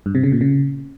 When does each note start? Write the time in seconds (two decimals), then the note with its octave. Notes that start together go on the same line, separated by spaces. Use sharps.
0.06 G2
0.15 C3
0.23 C#3
0.32 A#2
0.41 C#3